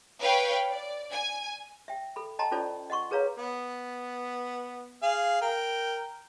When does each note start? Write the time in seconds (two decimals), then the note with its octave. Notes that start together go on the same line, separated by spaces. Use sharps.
0.20 B4 C#5 F5 G5
0.71 D5
1.12 G#5
1.88 E5 G5
2.16 A4 B5
2.39 D#5 G5 A5 A#5 C6
2.51 C#4 F4 A4 C5 D5
2.90 D#5 F#5 C6 C#6
3.11 G#4 A#4 B4 C#5 F5 A#5
3.37 B3
5.02 G#4 F5
5.41 A#4 G5